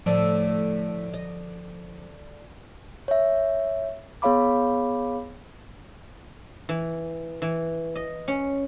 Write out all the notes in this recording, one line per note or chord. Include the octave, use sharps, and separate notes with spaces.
A2 D3 F3 A3 D4
D#5
C#5 E5
B3 G#4 C#5 F5 B5 D6
E3
E3
D#5
C#4